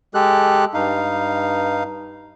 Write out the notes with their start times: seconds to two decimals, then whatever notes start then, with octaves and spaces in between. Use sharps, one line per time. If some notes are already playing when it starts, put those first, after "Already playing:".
0.15 G#3 G4 A4 F#6
0.74 G2 D#4 F5